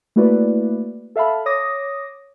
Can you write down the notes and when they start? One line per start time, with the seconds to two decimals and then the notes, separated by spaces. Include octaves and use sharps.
0.16 A3 A#3 E4 F#4 B4 D5
1.16 A4 E5 F5 A5 B5
1.46 C#5 D6 D#6 A#6